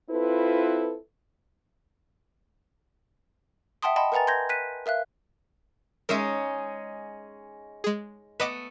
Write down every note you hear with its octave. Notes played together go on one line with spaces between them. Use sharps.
C4 E4 F4 A4 B4
E5 F#5 G5 A5 C6 D#6
D#5 F#5 G5 A5 B5 C6
A#4 B4 F#5 G#5 A#5 A6
C6 G6 G#6 A#6
F#6 B6 D#7
A#4 E5 F5 F#6
G#3 C#4 D#4 A#4 E5
G#3 G#4
A3 B3 B4 D#5 D6